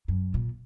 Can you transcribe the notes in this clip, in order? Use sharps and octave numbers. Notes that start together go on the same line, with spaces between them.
F#2
A#2